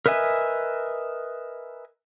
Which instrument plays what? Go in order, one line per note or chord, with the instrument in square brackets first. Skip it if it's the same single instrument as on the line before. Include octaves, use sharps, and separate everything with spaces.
[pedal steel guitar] A#4 B4 D#5 E5 G#5